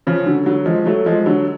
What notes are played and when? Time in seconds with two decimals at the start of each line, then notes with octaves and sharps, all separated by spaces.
0.07 C#3 F3
0.26 D3 F#3
0.46 D3 F#3
0.66 F3 G#3
0.86 F#3 A3
1.06 F3 G#3
1.26 D3 F#3